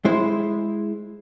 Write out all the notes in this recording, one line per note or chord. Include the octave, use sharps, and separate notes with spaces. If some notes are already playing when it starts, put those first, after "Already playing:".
G#3 E4 C5